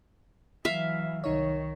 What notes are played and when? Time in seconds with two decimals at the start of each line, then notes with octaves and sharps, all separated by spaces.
0.65 E3 F#3 E5 F5
1.24 C2 D#3 D#4 C#5